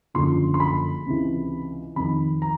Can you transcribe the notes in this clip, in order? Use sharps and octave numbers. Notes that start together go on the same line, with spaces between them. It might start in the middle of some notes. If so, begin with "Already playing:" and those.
F#1 F#2 D3 F3 C6
C6
B5
C#2 C3 E3
F2 C3 D#3 B5
A#5